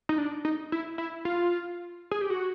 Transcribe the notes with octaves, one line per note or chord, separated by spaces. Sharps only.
D#4
D4
D#4
E4
E4
F4
G#4
G4
F#4